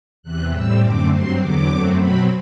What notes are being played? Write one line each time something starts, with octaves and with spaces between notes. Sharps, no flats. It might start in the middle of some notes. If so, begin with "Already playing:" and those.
E2 C3 E3 F#6
A2 G3 C4 E6
F#2 D3 A3 C4 D6
G2 F#3 C4 C6
E2 D3 F#3 B3 D6
F#2 F#3 A3 C4
B2 F#3 C4 B5